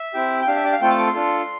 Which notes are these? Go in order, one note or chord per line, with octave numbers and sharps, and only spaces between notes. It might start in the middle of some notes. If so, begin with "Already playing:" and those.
Already playing: E5
C4 E4 G4
G5
D4 G4 F5
E5
D5
F5
A3 C4 F4 A4 G5
A5
D6
C6
D4 F4 A4